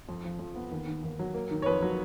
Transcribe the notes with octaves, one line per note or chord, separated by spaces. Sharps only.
F2
F3
F2
B3
D#2
D#3
D#2
F#3
A#3
D#3
C#5
F2 B4
F#3